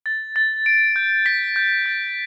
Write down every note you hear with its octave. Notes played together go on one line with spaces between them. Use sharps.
A6
A6
D7
G6
B6
G6
A6